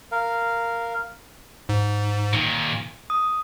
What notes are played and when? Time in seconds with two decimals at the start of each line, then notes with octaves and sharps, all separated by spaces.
0.12 A#4 F5
1.69 G#2
2.33 A#2 D#3
3.10 D#6